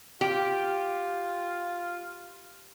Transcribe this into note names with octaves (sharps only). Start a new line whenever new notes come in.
F4 G4